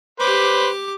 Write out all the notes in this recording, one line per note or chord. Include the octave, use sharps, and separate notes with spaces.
G4 B4 C5 D6